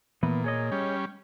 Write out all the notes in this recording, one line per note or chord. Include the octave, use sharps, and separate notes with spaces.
A#2 E3 B3
G#4 C#5 D#5
G3 C#4